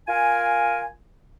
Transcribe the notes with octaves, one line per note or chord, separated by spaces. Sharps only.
F4 A#4 G#5